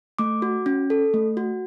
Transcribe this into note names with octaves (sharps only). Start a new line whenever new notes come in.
A3 D6
F#4
C#4
A4
A3
F#4